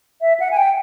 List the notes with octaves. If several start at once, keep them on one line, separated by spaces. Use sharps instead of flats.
E5
F#5
G#5
G5